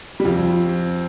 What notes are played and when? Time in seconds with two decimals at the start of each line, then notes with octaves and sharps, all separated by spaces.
0.20 G3
0.25 F2 F3